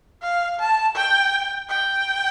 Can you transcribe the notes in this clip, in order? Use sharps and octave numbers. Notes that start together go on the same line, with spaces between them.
F5
A5
G5
G5